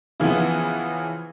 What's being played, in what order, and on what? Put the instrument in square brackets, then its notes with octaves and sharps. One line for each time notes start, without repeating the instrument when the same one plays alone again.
[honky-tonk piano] C#3 E3 F3 B3